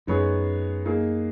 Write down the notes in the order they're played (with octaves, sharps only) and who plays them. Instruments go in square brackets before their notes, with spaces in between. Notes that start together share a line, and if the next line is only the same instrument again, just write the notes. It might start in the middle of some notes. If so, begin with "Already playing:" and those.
[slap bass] F#2 [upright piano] G#3 B3 D#4 G#4 C#5
[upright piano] A#3 D#4 G#4